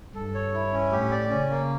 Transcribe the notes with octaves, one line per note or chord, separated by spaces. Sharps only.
G2 A4
C#5
E4
C#4
A2 G4
D5
C#3 C#4
A#3